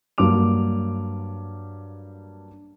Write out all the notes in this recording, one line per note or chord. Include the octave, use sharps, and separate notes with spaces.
G2 F#3 A#3 D6 F7